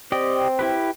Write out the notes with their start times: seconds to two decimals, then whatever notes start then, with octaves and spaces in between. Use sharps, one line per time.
0.12 C4 G4 D5 D#5
0.59 E4 G4 B4